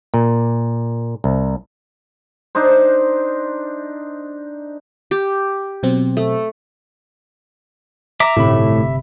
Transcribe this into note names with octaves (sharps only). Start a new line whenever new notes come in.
A#2
C2
D4 D#4 C5
G4
B2 F#3 C4
A3
E5 A#5 D6
G1 A2 C3 B5